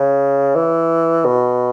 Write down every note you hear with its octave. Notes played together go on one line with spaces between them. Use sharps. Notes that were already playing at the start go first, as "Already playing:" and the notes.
Already playing: C#3
E3
B2